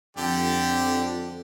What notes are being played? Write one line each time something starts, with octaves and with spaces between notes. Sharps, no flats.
F2 D3 G4 D5